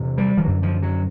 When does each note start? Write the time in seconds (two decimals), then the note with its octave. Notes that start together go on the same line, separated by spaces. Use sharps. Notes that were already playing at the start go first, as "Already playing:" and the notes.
Already playing: E2 C3
0.18 G3
0.37 F3
0.43 F#2 D3 F#3
0.63 F3
0.82 F#3